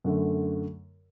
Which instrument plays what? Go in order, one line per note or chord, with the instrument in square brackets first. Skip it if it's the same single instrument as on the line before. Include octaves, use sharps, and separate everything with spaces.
[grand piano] F#2 D3 A3